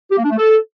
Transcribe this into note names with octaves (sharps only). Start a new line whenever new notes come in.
G4
A#3
D4
A3
A4